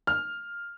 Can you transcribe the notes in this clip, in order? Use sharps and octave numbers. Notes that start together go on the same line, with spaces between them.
F6